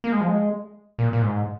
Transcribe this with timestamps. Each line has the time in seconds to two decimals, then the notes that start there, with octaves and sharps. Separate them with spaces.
0.04 A#3
0.12 G#3
0.21 F3
0.28 G#3
0.98 A#2
1.13 A#2
1.22 G#2